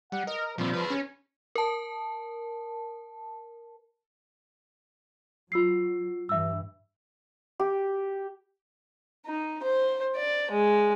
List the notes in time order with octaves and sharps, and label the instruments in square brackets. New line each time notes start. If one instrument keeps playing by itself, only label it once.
[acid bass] G3 [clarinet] F#5
[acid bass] A#4 [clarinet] D#5
[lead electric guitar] A#2 C4 [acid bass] F3 [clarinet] G3
[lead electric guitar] G#4 B4
[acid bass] C#4 [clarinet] C#5
[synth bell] A#4 A5
[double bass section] F#3 [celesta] F4 E6 C7
[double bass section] G2 E3 [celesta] E5 E6
[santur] G4
[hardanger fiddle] D#4
C5
D5
G#3